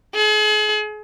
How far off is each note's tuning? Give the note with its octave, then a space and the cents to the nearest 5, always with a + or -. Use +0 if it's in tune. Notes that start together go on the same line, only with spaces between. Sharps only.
G#4 +40